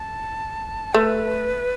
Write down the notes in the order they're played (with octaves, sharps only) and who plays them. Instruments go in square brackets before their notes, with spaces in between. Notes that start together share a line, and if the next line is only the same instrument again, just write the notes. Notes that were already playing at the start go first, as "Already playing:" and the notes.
Already playing: [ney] A5
[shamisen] A3 [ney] B4